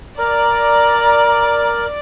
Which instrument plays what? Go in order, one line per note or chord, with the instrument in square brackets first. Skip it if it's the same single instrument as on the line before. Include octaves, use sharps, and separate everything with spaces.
[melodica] A#4 [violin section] D5 [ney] A#5